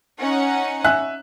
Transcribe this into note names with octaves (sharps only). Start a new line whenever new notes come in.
C#4 D#4 F#5
E5 G#5 F#6